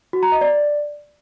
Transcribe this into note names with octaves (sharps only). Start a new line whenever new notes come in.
F#4
A#5
D#5
D5